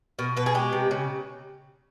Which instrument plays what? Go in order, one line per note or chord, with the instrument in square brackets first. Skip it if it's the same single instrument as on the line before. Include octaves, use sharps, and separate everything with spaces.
[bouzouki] B2 A#4
B2 B4
G#4
G#3 G4
C3
C#3